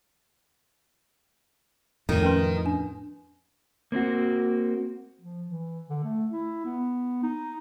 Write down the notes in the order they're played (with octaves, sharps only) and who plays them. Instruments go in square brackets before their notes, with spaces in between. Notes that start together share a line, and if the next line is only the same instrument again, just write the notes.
[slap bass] F2 A2 [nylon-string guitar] D#3
[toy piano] C#4 B4 C6
D4
[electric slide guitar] A#3 C4 D4 F#4
[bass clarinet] F3
E3
D3
A3
E4
B3
D#4